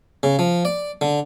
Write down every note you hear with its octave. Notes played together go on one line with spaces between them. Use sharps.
C#3
F3
D5
D3